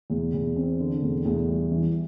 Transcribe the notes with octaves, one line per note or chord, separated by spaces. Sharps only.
E2
E2
C4
D3
E2
E2
G3
E3